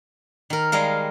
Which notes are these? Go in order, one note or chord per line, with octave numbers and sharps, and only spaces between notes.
D#3 A#4
G3 G#3 A#4 F5